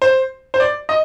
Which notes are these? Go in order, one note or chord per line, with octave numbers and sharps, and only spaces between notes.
C5
C5
D5
D#5